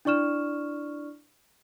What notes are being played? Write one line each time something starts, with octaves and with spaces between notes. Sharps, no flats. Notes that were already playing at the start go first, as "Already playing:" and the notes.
D4 E4 D5 C#6 F6 E7